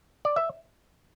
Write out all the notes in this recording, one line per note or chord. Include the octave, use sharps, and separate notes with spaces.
D5
E5